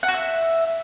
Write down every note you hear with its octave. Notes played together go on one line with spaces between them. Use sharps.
F#5
F#4
E5